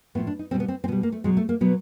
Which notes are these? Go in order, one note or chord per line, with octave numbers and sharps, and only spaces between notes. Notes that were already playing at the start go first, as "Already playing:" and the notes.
A2 F3 B3
D4
D#4
B2 G3 C4
B3
C4
C4
B2 G3 B3
A#3
A3
B2 F#3 G#3
A3
A#3
B2 F#3 B3